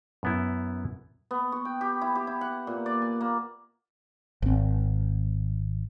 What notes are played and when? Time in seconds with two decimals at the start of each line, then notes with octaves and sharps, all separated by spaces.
0.23 F#2 B3 E4
1.31 B3
1.52 C#6
1.65 G5
1.81 G4
2.02 E4
2.15 G4
2.27 E4
2.41 F#5
2.67 A#2
2.86 D5
3.02 G#5
3.21 A#3
4.42 G#1 C4